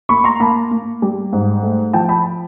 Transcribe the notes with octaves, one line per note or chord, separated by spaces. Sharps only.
A#3 B5 C#6
A#5 C6
A#3 A5 B5
A#3
G3
G#2
A3
F3 G5 A5
A5 B5